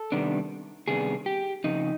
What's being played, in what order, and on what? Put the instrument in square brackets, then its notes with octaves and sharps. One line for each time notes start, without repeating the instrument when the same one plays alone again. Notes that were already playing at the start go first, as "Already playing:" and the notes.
Already playing: [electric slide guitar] A4
C3 D#3 G3 B3 D4
C3 D#3 G3 B3 D4 G#4
G4
F2 C#3 D#4